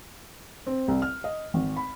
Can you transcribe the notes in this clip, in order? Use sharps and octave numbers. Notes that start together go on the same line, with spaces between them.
C4
C2
F6
D#5
G#1
B5